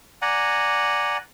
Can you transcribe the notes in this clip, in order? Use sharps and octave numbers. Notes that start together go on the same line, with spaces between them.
D5 F#5 G#5 A#5